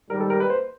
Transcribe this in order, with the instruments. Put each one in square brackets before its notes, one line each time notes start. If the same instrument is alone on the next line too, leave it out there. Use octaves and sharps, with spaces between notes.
[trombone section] G#2 D#3 G3 [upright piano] A#4
[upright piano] A4
A#4
B4
C5